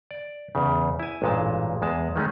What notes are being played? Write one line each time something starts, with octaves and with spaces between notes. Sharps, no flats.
D5
E2 C#3
E4 G#5
A1 G2 A#2 G#3 A5
E2 G#3 A5
D#3 G#3 A3 C#4